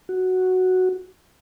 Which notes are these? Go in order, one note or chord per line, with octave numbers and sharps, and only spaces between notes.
F#4